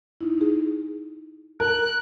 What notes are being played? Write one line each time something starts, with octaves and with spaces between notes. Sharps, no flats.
D#4 E4
D#4 G#4
A#4 F#6